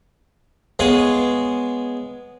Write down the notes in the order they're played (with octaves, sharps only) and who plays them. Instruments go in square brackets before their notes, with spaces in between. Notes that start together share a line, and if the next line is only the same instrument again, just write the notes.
[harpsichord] G#3 B3 G#4 C#5 F5